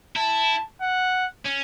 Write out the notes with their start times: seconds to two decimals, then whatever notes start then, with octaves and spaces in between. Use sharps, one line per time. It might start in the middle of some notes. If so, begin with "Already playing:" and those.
0.16 E4 A5
0.81 F#5
1.45 C#4